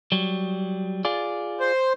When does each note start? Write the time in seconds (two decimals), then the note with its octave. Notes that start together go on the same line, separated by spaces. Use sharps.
0.12 F#3 G3
1.05 F4 G#4 D5
1.60 C5